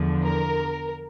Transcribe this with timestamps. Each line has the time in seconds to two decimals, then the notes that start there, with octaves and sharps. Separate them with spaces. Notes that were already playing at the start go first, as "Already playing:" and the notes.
Already playing: E2 D3 F3
0.22 A#4